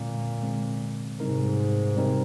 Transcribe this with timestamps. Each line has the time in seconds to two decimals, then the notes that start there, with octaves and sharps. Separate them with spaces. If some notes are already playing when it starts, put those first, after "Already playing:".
Already playing: A#2 D3 G#3 C4
0.43 D3 G#3 C4
1.20 G#2 C3 G3 C4 D#4 A#4
1.97 C3 G3 C4 D#4 A#4